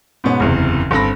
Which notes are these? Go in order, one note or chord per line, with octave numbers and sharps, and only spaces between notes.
G#2 B2 B3 C#4
F#1 E2 C3
G1 C4 A4 B5 A#6